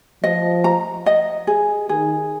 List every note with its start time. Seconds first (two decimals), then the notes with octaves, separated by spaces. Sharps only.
0.24 F3 D#5
0.64 A#5
1.06 D#5
1.47 G#4
1.89 D#3 G#4